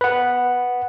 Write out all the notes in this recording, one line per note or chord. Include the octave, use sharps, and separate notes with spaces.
B4 F#5